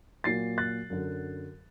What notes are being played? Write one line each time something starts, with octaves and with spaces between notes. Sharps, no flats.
A#2 F#3 A6 C7
F#6 A6
F#2 D3 F#3